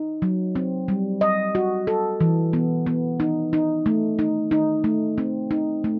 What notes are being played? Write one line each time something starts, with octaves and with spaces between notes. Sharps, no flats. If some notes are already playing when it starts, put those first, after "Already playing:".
Already playing: D#4
F#3
C4
G3
D#5
F#4
A4
E3
B3
B3
D#4
D#4
A3
D#4
D#4
A3
C4
D#4
A3